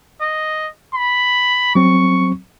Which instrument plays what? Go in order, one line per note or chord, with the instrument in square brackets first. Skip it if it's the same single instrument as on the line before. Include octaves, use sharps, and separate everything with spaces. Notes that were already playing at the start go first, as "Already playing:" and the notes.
[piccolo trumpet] D#5
B5
[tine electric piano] F#3 C4 [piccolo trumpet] C#6